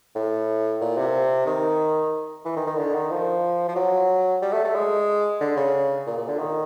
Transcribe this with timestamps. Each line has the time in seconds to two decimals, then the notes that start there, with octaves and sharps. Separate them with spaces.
0.15 A2
0.81 A#2
0.98 C3
1.46 D#3
2.45 E3
2.56 D#3
2.67 D#3
2.78 D3
2.95 D#3
3.11 F3
3.68 F3
3.76 F#3
4.42 G3
4.53 A3
4.64 A3
4.75 G#3
5.41 D3
5.57 C#3
6.06 A#2
6.17 A#2
6.28 D3
6.39 D#3